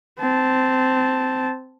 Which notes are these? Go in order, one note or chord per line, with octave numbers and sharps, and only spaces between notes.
C4 A5